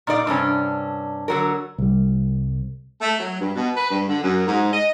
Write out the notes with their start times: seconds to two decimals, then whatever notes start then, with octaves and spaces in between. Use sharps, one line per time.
0.07 A#2 D#4 D5 F5
0.27 G2 C3 C#4 D4
1.28 D3 F#3 A#4
1.78 C2 G3
3.01 A3
3.20 F#3
3.40 G2
3.55 B2
3.76 B4
3.91 G2
4.09 D3
4.23 F#2
4.47 G#2
4.72 D#5